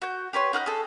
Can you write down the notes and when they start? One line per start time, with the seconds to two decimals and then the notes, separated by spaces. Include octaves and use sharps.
0.02 F#4 G6
0.33 G4 B4 C#5 C6
0.53 D#4 F#5 F6 G6
0.66 G#4 A4